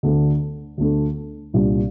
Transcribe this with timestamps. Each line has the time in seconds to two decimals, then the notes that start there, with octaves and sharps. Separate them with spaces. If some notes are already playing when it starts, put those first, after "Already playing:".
0.03 D2 D3 A3 D4 A4
0.78 D2 D3 A3 D4 A4
1.53 C2 A#2 G3 D4